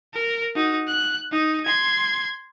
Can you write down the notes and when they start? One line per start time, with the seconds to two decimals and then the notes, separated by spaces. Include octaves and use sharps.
0.14 A#4
0.56 D#4 F#4
0.88 F#6
1.32 D#4
1.65 C6 G#6